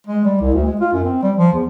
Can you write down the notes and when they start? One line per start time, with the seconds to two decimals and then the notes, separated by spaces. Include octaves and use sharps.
0.07 G#3
0.25 G3
0.41 C2
0.53 D2
0.66 G#3
0.80 F4
0.93 F#2
1.05 C4
1.22 G3
1.37 F3
1.53 E2